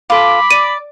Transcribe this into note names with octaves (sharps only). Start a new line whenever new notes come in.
F4 A4 B5 D6
D5 D#7